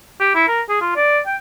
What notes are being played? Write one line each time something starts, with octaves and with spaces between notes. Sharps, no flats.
G4
E4
A#4
G#4
F4
D5
G5